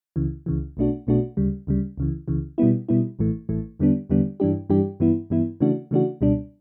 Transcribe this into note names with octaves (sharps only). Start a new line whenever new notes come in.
C#2 C#3 E3
C#2 C#3 E3
B1 B2 A3 D4 F#4
B1 B2 A3 D4 F#4
D2 C#3 G3
D2 C#3 G3
C#2 C#3 E3
C#2 C#3 E3
B2 G3 B3 E4
B2 G3 B3 E4
A1 A2 E3 A3
A1 A2 E3 A3
E2 D3 G3 B3 D4
E2 D3 G3 B3 D4
G2 E3 G3 D4 G4
G2 E3 G3 D4 G4
G2 E3 B3 E4
G2 E3 B3 E4
C#3 E3 A3 D4 F#4
C#3 E3 A3 D4 F#4
C#2 B2 G3 D4